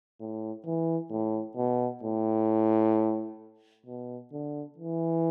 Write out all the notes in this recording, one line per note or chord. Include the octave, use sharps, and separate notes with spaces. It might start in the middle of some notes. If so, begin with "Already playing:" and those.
A2
E3
A2
B2
A2
B2
D3
E3